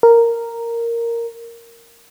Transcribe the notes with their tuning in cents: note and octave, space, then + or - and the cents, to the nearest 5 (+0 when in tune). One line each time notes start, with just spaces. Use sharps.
A#4 -5